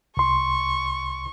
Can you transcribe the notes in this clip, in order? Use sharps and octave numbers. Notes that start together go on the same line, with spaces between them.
C2 C6 C#6